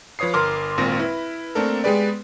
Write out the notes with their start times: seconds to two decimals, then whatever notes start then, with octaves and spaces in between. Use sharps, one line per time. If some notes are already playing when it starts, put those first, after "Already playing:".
0.19 F3 B4 C#5 D#6 C7
0.34 G1 A#4 C6 D6 F6
0.78 G#1 A#2 C4 A#6
0.99 E4 B4
1.55 A3 A#3 C4 D4 A4 A#4
1.84 G#3 B3 G4 G#4 B4 D5